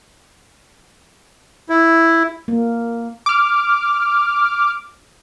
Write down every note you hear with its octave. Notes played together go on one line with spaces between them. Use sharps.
E4
A#3
D6 F6